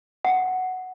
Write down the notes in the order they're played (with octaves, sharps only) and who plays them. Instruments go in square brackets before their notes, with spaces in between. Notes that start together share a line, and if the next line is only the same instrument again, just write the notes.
[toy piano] F#5